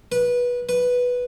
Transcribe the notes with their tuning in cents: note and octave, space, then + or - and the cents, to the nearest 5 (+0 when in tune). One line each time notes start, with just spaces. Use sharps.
B4 -20
B4 -5